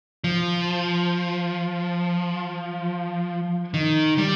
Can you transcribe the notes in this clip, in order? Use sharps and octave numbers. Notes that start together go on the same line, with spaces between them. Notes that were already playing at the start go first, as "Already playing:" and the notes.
F3
D#3
G3